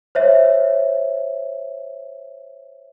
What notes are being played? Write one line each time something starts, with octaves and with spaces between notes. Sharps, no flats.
C5 C#5 E5